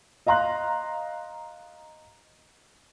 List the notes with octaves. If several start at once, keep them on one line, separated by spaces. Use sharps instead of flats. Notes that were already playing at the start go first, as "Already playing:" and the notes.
D#5 F5 A#5 C6 F#6